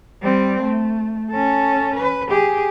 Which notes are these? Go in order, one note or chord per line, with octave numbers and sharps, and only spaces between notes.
G3 C4
A3
C#4 A4
B4
G4 G#4